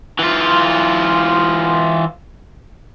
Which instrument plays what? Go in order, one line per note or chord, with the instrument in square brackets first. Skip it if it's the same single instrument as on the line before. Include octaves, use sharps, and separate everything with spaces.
[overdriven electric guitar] E3 F4